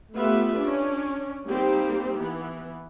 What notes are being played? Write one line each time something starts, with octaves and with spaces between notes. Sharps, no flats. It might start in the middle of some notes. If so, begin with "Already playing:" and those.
A3 B3 F4 G4 B4 E5
C#4 D4
G3 A#3 C4 D#4 G4
E3 B3